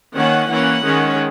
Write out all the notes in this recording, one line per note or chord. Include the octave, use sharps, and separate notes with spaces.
D#3 A#3 C#4 F#5
E3 A#3 C#4 F#5
D#3 G#3 C#4